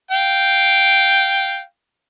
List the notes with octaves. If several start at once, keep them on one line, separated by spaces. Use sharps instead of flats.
F5 G5